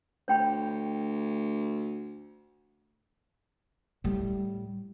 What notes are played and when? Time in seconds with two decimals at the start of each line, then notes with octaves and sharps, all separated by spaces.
0.28 D2 C#5 G5 B5
4.04 A2 G3